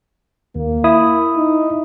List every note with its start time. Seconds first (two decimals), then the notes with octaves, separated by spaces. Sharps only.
0.56 D#2 A#3
0.84 E4 D#6
1.37 D#4